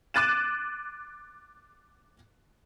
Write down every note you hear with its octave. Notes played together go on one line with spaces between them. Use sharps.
D6 F#6 A6 D#7 E7